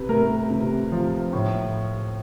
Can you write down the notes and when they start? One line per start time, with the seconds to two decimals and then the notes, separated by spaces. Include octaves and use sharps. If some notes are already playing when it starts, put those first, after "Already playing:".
Already playing: C3 B4
0.09 A3 A#4
0.51 C3
0.92 F3
1.33 A2